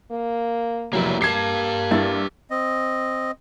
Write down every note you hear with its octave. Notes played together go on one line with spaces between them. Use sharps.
A#3
F1 F#3 A#3 E4
A#3 G4 A5 G#6 C7
G2 E4 A6
C4 D#5